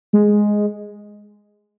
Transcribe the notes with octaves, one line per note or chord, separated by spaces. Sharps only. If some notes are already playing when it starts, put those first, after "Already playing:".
G#3